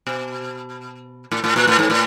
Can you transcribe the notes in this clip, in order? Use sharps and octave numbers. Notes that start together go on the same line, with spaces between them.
B2
A2
A2
A#2
A2
G#2
A2